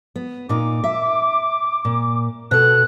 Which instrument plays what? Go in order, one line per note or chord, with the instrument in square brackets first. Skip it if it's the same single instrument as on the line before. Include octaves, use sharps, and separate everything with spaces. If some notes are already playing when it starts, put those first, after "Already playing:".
[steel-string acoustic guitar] B3
[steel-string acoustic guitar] A#2 D#4 [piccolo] D6
[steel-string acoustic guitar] E5
A#2
[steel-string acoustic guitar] B2 A4 [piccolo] F#6